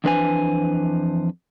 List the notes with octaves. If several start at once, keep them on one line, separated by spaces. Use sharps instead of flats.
F2 E3 D4 B4 C5 G#5